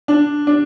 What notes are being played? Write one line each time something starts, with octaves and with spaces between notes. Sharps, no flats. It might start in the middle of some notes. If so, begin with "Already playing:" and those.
D4
D4